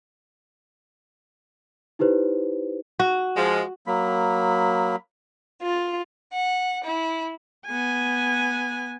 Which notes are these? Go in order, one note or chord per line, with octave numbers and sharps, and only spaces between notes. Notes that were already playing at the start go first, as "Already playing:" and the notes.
D#4 E4 G4 B4 C5
F#4
F3 G#3
F#3 A#3 B5
F4
F#5
E4
B3 G#5